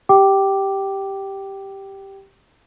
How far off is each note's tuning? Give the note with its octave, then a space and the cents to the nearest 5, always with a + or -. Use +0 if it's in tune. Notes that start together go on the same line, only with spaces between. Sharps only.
G4 +0 G5 -15 D6 +0